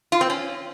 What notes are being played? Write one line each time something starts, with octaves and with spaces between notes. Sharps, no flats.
F4
C4
C#4